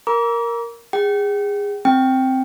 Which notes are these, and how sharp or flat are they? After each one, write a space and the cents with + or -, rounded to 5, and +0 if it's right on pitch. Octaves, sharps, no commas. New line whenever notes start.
A#4 +0 A#5 +30 D6 -30
G#4 -25 G5 -35
C4 +0 G5 +0